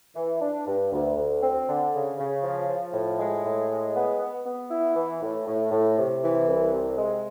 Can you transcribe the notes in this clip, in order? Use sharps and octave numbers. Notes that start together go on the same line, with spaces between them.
E3
D4
G2
D2
D2
C4
D3
C#3
C#3
F3
F3
A2
G#3
A2
G#3
B3
B3
B3
E4
E3
A2
A2
A2
C3
E3
C2
C3
G#3